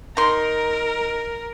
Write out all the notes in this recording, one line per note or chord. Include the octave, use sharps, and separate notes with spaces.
D#4 A#4 C6